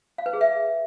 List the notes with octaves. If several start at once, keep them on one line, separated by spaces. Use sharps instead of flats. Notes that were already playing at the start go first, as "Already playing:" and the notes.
F5
B4
G#4
E5